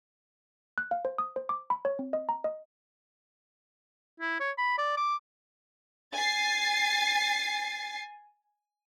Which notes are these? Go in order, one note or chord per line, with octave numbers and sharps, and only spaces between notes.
F#6
F5
C5
D#6
C5
D6
B5
C#5
C4
D#5
A#5
D#5
E4
C#5
B5
D5
D6
G#5 A6 C7